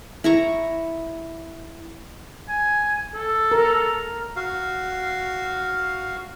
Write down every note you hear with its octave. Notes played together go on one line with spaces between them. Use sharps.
E4 A#5 C#6
G#5
A4
A#4
F#4 F5